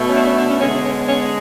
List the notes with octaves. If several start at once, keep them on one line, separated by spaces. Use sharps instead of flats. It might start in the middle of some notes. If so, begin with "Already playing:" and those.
Already playing: B2 A3
C#4
D4
C#4
D4
C#4
D3 G#3 B3 C#4
C#4
C#4